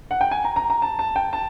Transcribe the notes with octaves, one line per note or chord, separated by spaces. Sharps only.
F#5
G5
G#5
A#5
A#5
A#5
A5
A5
G5
A5